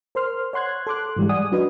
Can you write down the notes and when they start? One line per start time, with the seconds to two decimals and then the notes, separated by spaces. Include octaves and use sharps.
0.15 A#4 C5 C6 F6
0.53 C#5 F#5 C6 F#6 G#6
0.87 A4 C6 D6 F#6
1.17 G#2 E3 G3 G#3
1.29 D5 F#5 G#5 D#6
1.52 F#3 D4 F#4 B4 D#5